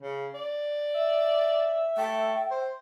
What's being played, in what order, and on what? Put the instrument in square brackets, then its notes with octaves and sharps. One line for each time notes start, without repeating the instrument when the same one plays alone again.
[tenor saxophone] C#3
D5
[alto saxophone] E5
[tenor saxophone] A3 [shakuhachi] G5
[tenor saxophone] C5